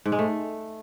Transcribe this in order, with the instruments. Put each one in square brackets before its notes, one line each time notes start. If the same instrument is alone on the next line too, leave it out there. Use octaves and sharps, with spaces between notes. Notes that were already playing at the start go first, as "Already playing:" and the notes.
[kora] G#2
G#3
A3